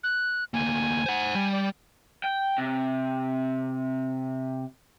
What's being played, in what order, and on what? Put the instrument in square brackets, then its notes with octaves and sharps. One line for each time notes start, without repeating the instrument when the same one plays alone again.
[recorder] F#6
[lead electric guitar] D2 A#3 [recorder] G#5
[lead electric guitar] C5 F#5
G3
[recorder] D5
[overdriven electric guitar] G5
C3